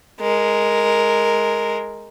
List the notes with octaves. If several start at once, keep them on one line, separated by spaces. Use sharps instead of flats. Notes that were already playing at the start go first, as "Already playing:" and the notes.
G#3 A#4